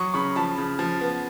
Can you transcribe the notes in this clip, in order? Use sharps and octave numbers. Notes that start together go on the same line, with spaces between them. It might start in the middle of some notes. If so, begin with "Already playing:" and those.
Already playing: F#3 C#6 D#6
C#3 B5 C#6
F3 A5 B5
C#3
F3
B3